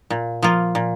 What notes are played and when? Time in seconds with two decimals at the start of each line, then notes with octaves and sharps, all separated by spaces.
0.10 A#2
0.42 F3 A#3 F4
0.75 A#2